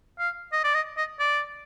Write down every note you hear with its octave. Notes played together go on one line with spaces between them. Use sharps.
F5
D#5
D5
D#5
D#5
D5